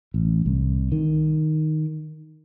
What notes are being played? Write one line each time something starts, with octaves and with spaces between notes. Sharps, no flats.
A1
C2
D#3